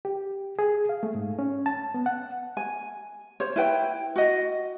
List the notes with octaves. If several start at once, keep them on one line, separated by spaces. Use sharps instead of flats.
G4
G#4
F5
A3
G#2
C#4
A5
B3
F#5
G#5
C5 C#5
E4 B4 G5
F#4 D#5